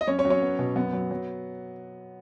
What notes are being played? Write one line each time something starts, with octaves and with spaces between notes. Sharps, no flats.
D#5
F#2 C#4 C#5
C#4 C#5
F#3
C#4 C#5
B3
B2
F#2 B3
F#3
F#3